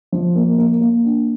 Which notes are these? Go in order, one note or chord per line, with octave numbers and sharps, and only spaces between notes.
F3
A#3
A#3
A#3
D4